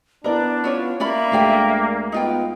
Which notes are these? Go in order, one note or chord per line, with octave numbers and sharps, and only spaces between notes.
B3 D4 E4 A#4 B4 D5
C#4 F4 C#5
A#3 C#4 D5 E5 B5
D2 G#3 A3 D4 D5 G5
B3 D#4 F4 G5